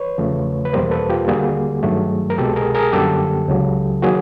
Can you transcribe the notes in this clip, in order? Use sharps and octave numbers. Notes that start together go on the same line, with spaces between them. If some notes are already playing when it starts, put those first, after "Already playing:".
Already playing: B4 C#5
E2 C#3 F3 A3
B4
E2 B2 G3 A#3 A#4 C5
A4 B4
F4 G4
D#2 D3 G3 A#3 F#4 G#4
G2 D#3 F#3 A3
A#4
C2 B2 G#3 G4 A4
G#4 A#4
G#4 A#4
F#2 D3 G3 A#3 G4 A4
C#2 C#3 F#3
D#3 F#3 A#3 F#4 G#4